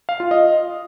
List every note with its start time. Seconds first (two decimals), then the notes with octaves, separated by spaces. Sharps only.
0.09 F5
0.20 F4
0.31 D#5